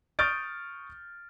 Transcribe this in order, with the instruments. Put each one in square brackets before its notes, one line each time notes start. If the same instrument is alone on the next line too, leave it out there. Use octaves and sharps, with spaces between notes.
[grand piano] C#6 D#6 F6 G6 A6 D7